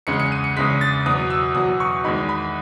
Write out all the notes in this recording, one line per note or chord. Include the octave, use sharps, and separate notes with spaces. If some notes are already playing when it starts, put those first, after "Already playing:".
E2 C#3 G#3 C#7
C#7
D#7
C#7
E2 C#3 G#3 B6
A6
E2 B2 F#3 D#6
E6
E2 B2 F#3 D#6
C#6
E2 D#3 G#3 D#4 B5
B5